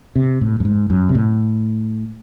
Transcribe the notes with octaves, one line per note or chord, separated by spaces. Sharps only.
C3
A2
F#2
G#2
F#2
C3
A2